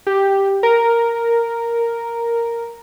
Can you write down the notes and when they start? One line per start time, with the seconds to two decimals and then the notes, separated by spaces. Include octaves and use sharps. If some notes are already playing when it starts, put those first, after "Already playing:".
0.07 G4
0.63 A#4